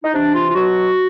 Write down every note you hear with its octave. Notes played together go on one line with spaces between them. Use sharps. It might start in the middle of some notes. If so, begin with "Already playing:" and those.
D#4
C3 E3 D4
F4
F4
B2 F#3 F#4